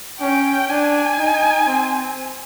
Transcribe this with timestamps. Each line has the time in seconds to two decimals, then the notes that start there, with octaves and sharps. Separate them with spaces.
0.21 C#4 G5
0.69 D4 G#5
1.18 D#4
1.67 C4